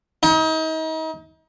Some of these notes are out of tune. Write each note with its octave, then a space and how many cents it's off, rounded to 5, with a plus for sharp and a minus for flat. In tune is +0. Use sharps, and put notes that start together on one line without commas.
D#4 +35